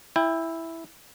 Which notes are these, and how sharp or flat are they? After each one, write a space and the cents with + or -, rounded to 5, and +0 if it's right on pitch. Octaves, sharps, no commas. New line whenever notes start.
E4 +0 G5 +30